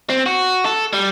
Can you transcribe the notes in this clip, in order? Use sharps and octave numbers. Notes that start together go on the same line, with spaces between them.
C4
F#4
A4
G3